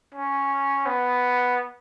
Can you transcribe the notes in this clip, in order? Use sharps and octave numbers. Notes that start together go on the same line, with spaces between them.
C#4
B3